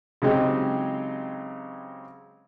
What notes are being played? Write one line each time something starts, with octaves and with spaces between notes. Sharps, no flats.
C#3 F#3 G#3 C4 D#4 G4